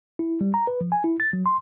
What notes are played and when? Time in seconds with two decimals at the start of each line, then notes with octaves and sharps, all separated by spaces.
0.19 E4
0.41 G3
0.54 A#5
0.67 B4
0.81 F3
0.92 G#5
1.04 E4
1.20 A6
1.33 F#3
1.46 C6